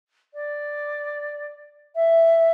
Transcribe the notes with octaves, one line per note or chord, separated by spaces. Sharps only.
D5
E5